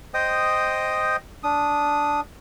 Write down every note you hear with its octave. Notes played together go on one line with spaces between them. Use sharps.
C5 D#5 G5 D#6
D4 D#6